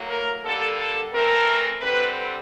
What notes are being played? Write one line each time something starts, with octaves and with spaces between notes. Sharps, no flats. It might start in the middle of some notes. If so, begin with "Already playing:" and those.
Already playing: A2 F#3 A#3
A#4
D3 G3 A#3 A4
A4
E3 A3 C4 A#4
D3 G3 C4 B4